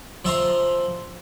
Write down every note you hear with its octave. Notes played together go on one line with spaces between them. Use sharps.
F3 E5 A#5 C6